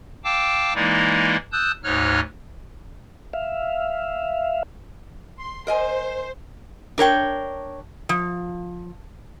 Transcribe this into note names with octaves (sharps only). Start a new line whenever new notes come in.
F5 G5 A5 D6 E6
E3 G#3 A#3 D#4 E4 D5
A5 D#6 E6 F#6 G6
D2 G#2 D#4 C#5 F6 F#6
E5 F5
C6
A#4 C5 D#5 G#5
D4 A#4 C#5 G5
F3